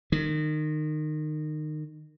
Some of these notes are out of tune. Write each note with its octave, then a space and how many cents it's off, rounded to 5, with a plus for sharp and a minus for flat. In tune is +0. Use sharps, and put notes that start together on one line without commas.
D#3 -25